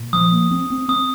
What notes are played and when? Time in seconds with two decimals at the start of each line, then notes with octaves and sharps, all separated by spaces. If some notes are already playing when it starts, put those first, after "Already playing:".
Already playing: A#2
0.13 F3 D#6
0.32 A#3
0.51 C4
0.70 C4
0.88 C4 D#6